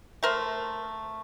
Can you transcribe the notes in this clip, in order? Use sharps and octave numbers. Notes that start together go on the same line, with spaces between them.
A3 A#4 C5